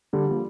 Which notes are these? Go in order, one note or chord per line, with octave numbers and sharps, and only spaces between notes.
D3 G3
F3 A#3